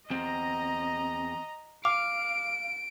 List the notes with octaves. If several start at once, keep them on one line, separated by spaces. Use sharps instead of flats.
E2 C4 D#5 A#5
F5 D6 D7